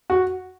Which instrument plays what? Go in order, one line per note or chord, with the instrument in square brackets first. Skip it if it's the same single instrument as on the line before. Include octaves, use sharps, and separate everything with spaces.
[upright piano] F#4